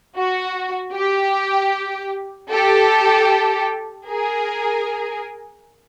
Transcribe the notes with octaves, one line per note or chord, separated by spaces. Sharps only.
F#4
G4
G4 A4
G#4 A#4